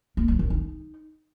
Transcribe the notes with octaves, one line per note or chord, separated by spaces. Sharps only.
A#3
F#3
D#3
D#4